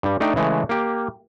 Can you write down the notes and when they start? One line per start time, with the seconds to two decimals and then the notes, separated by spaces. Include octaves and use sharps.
0.03 G2 G3
0.20 A3 D4 D#4 D5 G5
0.36 C#3 E3 G#3 A3
0.69 A#3 G4